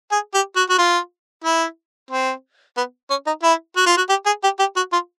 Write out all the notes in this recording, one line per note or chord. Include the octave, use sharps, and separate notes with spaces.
G#4
G4
F#4
F#4
F4
E4
C4
B3
C#4
D#4
E4
F#4
F4
F#4
G4
G#4
G4
G4
F#4
F4